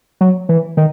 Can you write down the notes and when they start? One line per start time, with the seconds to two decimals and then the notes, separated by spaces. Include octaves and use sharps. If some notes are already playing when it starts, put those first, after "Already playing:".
0.21 F#3
0.49 E3
0.77 D#3